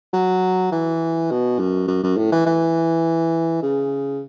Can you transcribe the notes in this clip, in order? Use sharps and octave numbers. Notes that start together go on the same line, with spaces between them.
F#3
E3
B2
F#2
F#2
F#2
A2
E3
E3
C#3